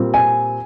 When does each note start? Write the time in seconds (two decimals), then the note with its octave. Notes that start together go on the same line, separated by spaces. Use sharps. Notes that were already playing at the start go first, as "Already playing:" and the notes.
Already playing: A#2 G3 C4
0.14 G#5